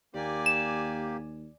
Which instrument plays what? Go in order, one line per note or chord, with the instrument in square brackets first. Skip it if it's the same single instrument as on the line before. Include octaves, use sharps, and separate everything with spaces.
[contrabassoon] D#2 [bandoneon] A#3 G4 [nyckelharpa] D5 G#5
[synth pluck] E7